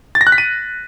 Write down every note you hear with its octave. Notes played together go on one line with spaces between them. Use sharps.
A6
A#6
F#6
B6
D#7